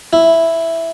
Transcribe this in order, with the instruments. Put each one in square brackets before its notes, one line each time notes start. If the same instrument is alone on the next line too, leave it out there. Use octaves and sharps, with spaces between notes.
[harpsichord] E4